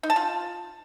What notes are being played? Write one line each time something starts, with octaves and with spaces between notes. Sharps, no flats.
D#4
A5
F4